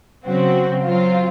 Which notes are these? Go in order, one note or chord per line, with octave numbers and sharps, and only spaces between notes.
C#3 F#3 C4 F#4
F#3 C4 F4